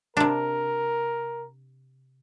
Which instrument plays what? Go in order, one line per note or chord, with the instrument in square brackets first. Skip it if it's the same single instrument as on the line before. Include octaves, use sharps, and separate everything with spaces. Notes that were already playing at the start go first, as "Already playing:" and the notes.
[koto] C3 D4 [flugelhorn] A#4